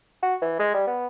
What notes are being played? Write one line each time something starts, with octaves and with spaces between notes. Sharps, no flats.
F#4
E3
G#3
G3
B3